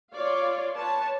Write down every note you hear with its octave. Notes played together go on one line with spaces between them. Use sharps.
F4 C#5 D5 F5
B4 C#5 A5